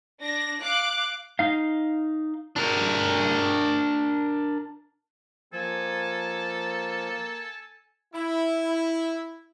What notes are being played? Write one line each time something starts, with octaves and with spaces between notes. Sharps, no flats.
D4 A#6
F5 D6 F#6
D#4 F5
D4 A#4
F3 A#3 A4 G#5
E4